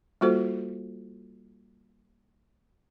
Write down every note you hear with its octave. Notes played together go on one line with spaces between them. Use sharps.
G3 A#3 F4 F#4 A4 C5